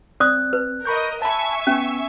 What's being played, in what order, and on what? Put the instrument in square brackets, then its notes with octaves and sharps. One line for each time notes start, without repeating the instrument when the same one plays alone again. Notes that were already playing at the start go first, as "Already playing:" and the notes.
[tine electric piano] C4 [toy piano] D5 D#6 [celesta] F#6
[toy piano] B4
[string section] A#4 D#5 [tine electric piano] B5 C#6 G6
[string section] E5 G#5 C#6 [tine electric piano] A5 B5
[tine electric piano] B3 [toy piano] C#4